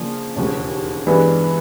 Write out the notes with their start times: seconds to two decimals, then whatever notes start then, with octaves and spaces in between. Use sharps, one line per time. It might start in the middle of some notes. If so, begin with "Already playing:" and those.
Already playing: C#3 F3 A#3 D4
0.36 E1 D#2 C#3 F3
1.07 G2 E3 G#3 B3 D4